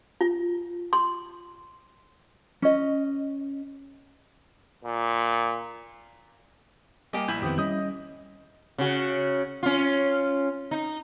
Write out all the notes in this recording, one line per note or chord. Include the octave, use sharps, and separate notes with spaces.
F4
C6
C#4 D#5
A#2
G3 A#3 G4 D#5 G#5
A#1 E4 G6
F2 D#3 B3 C4 G4 D#6
G3 C#4 D#5 D#6 G6
C#3 F#4
C#4 F4
D#4